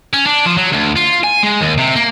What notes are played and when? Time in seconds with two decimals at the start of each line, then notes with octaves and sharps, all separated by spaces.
0.14 C#4
0.26 D4
0.46 F3
0.57 F#3
0.72 D2
0.96 F4
1.24 G#5
1.43 G#3
1.61 D#2
1.78 C3
1.96 A#3